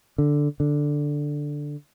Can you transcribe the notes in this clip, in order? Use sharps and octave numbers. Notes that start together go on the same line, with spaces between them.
D3
D3